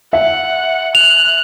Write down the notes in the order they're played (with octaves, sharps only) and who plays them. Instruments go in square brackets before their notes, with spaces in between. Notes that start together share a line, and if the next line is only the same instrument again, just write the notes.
[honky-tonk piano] E5 [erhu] F#5
[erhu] F#6 [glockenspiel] F7